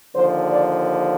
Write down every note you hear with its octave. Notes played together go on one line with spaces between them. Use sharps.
D#2 D3 F3 C5
D5